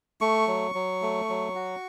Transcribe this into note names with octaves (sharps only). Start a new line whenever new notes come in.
A3 C#6
F#3
F#3
A3
F#3
F#4